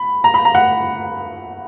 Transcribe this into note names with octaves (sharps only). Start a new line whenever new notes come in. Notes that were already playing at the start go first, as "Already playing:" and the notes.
Already playing: B5
A#5
B5
A#5
F#5